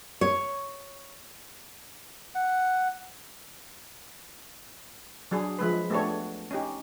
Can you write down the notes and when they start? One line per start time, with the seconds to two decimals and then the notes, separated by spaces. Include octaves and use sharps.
0.21 C#5
2.35 F#5
5.31 F#3 D4 G#4
5.59 F3 G#3 B4
5.90 A3 B3 D4 G4 A4 C#5
6.51 C#4 D#4 G4